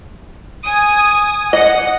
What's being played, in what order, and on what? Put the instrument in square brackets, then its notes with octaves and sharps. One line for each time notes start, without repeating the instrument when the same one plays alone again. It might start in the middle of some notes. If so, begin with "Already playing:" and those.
[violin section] G#5 D#6
[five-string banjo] D#5 [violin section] F#5